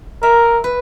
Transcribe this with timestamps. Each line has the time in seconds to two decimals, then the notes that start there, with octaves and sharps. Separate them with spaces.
0.22 A#4 E5
0.64 B4